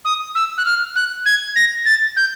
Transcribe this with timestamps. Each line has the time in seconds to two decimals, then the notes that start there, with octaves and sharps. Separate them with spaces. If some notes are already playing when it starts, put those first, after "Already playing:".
0.05 D#6
0.35 E6
0.58 F#6
0.65 F6
0.96 F#6
1.26 G#6
1.56 A#6
1.86 A6
2.17 G6